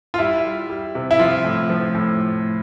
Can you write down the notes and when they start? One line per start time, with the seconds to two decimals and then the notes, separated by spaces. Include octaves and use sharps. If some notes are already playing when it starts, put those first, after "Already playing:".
0.14 F4
0.19 G3 E4
0.44 G3
0.70 G3
0.95 C3
1.11 E4
1.19 F3 F4
1.44 A2
1.70 F3
1.95 A2